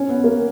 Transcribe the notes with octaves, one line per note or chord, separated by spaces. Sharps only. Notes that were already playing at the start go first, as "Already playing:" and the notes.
Already playing: C#4
B3
A#3